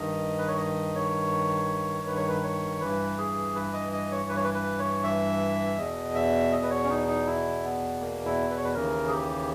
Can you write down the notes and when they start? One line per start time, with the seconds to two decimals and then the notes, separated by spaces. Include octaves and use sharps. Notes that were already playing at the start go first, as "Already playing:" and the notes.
Already playing: G2 D#3 D#5
0.38 B4
0.48 C#5
0.58 D#5
0.95 C#5
2.07 B4
2.17 C#5
2.28 B4
2.43 C#5
2.81 G2 E3 B4
3.18 G#4
3.55 B4
3.73 D#5
3.93 D#5
4.11 C#5
4.29 B4
4.36 C#5
4.44 B4
4.54 B4
4.79 C#5
5.03 E5
5.77 E2 B2 D#5
6.15 E5
6.52 D#5
6.63 B4
6.70 C#5
6.84 C#4
6.89 D#4
7.08 D#4
7.27 E4
7.64 B3
8.01 A#3
8.25 E4
8.50 B4
8.57 C#5
8.64 B4
8.74 D#2 C#3 E3 A#4
9.08 G#4
9.12 G4